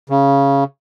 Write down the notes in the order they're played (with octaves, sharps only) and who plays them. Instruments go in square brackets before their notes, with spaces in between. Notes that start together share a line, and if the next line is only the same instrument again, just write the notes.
[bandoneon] C#3